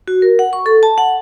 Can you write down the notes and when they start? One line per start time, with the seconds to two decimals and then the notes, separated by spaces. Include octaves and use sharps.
0.08 F#4
0.22 A#4
0.39 F#5
0.53 C#6
0.66 A4
0.83 A5
0.98 F#5